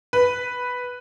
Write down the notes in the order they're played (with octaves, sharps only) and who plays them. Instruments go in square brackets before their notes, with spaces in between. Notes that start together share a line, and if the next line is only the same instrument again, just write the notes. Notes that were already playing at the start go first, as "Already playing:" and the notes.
[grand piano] B4